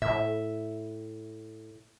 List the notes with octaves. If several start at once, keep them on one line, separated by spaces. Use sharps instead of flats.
A2 E5